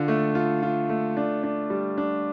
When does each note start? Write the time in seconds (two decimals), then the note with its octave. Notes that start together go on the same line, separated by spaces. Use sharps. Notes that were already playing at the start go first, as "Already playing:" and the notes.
Already playing: D3 F4
0.08 A3
0.35 F4
0.63 F4
0.89 A3
1.17 D4
1.43 D4
1.70 G3
1.98 D4